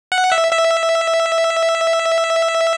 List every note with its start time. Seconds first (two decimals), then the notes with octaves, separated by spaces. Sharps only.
0.12 F#5
0.32 E5
0.52 E5